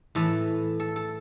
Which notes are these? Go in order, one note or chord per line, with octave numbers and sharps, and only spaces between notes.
A2 E3 A4
A4
A4